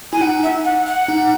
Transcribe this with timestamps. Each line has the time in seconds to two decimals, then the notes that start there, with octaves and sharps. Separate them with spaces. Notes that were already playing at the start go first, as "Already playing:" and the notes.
0.13 E4 G#5
0.21 D#4 F#5
0.43 E5
0.65 F#5
0.86 F#5
1.08 D#4